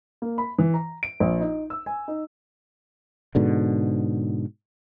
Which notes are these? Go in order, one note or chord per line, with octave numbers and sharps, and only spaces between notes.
A#3
B5
E3
A#5
D7
A#1
D#4
E6
G#5
D#4
G#2 B2 D3